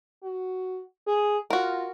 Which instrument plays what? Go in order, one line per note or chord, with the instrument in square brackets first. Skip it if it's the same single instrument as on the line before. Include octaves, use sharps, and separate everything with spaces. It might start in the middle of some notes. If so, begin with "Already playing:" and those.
[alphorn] F#4
G#4
[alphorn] F4 [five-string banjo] F#4 A#4